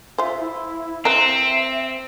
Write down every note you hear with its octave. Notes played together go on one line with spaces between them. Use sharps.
F4 C5 E5
E4
C4 B4 E5 F5 A#5